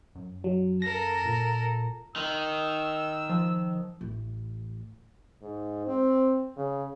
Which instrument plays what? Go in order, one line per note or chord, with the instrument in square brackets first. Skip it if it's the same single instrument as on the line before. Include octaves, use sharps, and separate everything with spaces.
[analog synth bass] F#2
[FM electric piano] F#3
[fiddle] A4 A#4 [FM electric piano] A#6
[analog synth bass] A#2
[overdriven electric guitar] D#3 [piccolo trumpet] E6
[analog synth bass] F3
[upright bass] A1
[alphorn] G#2
C4
C#3